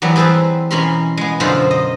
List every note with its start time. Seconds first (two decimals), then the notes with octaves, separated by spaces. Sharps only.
0.02 E3 F#3 G3 B3
0.16 C4 G#4 A4 B4 C5
0.71 B2 E3 C#4 A#4 B5 C6
1.17 G#3 B3
1.40 F#2 B2 D3 F4 C5 B5
1.71 D#5